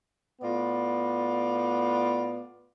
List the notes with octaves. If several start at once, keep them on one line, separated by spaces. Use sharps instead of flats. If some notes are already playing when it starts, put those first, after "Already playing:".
A2 B3 F4 D5